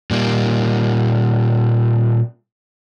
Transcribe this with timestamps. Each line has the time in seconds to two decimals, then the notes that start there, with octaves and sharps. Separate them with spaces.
0.11 A#2 G3 A#3